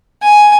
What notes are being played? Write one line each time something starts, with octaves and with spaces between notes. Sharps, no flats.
G#5